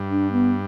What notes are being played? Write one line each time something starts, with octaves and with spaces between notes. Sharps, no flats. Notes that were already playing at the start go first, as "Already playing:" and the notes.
Already playing: G2
D4
B3